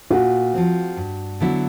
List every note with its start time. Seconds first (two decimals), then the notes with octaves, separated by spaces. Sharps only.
0.10 A#2 F#4
0.54 F3 G#3 C4
0.97 G2
1.41 D3 F#3 B3 E4